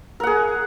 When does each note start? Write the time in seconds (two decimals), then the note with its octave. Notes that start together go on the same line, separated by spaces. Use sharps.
0.20 A#4
0.23 F#5
0.27 G#4